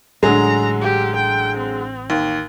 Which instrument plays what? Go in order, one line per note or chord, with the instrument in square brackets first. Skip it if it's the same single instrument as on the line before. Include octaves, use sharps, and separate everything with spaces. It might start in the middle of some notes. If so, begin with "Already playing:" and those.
[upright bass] A1 [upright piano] D3 F#3 G#3 [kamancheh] A#5
[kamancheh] G4
G5
C4
[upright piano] D#2